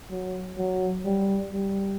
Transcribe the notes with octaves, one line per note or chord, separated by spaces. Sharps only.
F#3
F#3
G3
G3